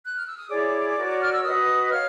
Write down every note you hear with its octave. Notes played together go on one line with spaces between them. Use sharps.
F#6
F6
E6
D#6
E4 G#4 C#5 D5 D6
F#4 A#4 C#5
F6
E6
F#4 B4 D#5 D#6
C#5 F5 F6